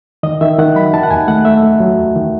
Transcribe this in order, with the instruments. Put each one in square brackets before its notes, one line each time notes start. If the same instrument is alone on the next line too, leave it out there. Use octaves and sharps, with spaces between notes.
[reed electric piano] D#3 D#5
D#3 E5
D#3 F#5
F#3 B5
D#3 A5
F#5
D#2 G#5
A3 F#5
A3 E5
A3
F#3
D#2
D#3